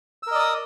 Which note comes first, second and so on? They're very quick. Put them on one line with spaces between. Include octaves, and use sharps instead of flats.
E6 A#4 D#5 D5 D#6